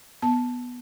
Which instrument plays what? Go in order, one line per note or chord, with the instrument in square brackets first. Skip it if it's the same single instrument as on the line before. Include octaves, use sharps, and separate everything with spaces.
[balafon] B3 A5